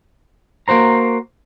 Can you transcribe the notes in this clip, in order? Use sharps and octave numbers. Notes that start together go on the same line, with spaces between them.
A#3 F#4 C5 A#5